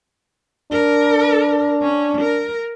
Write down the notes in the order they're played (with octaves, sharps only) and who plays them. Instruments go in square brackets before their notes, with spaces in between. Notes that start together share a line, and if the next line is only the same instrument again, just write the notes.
[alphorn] D4 [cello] A#4
[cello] C#4
A#4